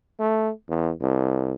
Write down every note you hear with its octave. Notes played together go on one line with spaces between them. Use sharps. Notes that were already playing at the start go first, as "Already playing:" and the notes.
A3
E2
C2